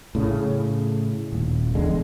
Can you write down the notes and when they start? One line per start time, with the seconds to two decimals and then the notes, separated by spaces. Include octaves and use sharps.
0.15 A2 C#3
1.33 D#1
1.75 E2 D3 G#3